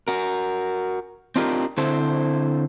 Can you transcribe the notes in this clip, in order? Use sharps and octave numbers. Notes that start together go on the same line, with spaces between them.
F#4 A#4
C4 D4 D#4 F4 G4 A#4
D3 C4 E4 A4 C5